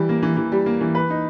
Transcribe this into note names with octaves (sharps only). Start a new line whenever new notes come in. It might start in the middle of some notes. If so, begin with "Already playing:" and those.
Already playing: E3 G3
A#3
E3
E3
G3
A#3
E3
B4
D#4